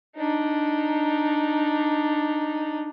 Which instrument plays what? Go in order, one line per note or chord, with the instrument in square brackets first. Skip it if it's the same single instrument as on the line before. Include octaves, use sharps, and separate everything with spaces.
[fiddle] D4 D#4